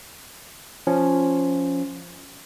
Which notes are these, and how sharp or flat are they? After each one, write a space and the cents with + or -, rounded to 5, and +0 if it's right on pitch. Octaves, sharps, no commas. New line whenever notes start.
F3 +0 C#4 +0